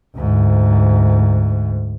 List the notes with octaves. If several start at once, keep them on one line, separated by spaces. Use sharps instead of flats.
D2 G#2